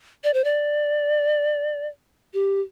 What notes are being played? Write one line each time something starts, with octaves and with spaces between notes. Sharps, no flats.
D5
C5
D5
G4